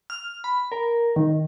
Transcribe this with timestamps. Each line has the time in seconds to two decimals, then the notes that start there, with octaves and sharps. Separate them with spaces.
0.10 F6
0.44 B5
0.72 A#4
1.16 D#3